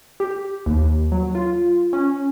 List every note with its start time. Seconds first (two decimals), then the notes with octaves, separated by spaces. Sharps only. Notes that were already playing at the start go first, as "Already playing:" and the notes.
0.20 G4
0.66 D#2
1.12 F#3
1.35 F4
1.93 C#4